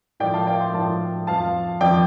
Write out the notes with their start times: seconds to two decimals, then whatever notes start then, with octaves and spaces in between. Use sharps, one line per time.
0.20 A2 F3 D5 G5
0.34 F5 A5
0.47 D5 G5
0.60 G5 C6
0.74 A2 F3 F5 A5
1.27 F2 F3 F5 A5
1.81 F2 F3 D5 G5